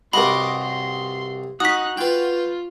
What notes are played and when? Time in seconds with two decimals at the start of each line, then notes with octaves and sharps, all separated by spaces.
0.13 C2 G2 F#4 A#4 D#5 B5 C6 D6
0.62 C6
1.60 D#4 F#4 D#6 F#6 B6
1.97 F4 B4 G5